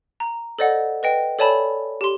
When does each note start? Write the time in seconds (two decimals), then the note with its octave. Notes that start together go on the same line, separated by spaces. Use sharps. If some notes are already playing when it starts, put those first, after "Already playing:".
0.20 A#5
0.59 A4 C5 D5 D#5 F#5
1.03 B4 D#5 G5
1.39 A4 C#5 D5 G#5 A5 B5
2.01 G4 C6